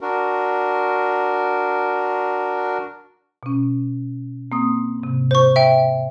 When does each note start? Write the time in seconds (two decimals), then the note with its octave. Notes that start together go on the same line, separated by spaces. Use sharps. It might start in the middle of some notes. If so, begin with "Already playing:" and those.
0.01 D4 F#4 A#4
3.43 B2 C#4
4.52 A#3 C4 D#6
5.00 G#2 C3
5.31 C5 C#6
5.56 E5 G5